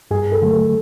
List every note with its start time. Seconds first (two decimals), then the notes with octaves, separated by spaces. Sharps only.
0.11 G2 G#4
0.32 A4
0.42 D3 F#3 A3
0.53 A4